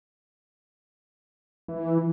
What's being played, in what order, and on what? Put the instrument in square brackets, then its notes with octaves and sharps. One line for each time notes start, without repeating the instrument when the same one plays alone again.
[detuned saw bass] E3